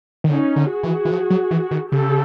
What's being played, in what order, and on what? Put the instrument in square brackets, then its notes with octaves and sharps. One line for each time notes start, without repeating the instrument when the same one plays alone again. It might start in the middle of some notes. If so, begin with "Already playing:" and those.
[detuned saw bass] D#3
[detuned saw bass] D3 [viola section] C#4 D#4
[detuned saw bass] D3
[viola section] F#4 G#4
[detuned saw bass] E3
E3
F3
F#3
E3
D#3
[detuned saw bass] C#3 [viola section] G4 A4